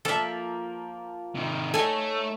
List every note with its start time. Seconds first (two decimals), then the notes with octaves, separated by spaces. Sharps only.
0.05 F3 A#3 A4 E5
1.35 C3 D#3
1.74 A3 D#4 A4 C#5 G#5